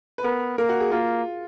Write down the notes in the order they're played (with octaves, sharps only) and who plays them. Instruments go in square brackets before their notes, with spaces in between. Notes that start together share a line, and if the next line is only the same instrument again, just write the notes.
[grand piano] B4
[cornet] B3 [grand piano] A#4
[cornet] A#3 [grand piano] A#4
[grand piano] F#4
G#4
[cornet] A#3 [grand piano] F4